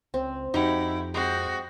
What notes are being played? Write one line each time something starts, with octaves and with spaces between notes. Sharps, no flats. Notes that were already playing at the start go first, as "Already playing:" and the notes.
C#2 C4
F2 D#4 E4 F#4 G4
G#3 C4 F#4